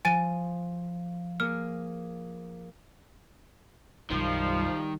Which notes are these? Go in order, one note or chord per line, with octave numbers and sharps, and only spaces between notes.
F3 G#5 A6 D#7
A#3 G#4 F6
B1 F#2 D#3 F3 G3